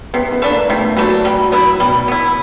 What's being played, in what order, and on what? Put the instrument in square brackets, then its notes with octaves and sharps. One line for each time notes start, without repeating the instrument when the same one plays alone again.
[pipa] C3 [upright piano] B3
[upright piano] B3
[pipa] E3 A3 D4
[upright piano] A#3
[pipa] C3 [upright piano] A3
[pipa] E3 A3 D4 [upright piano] F#3
[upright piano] F#3 [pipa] G3
[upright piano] F#3
[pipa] B3 E4
[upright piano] B2 [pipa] G3
[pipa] B3 E4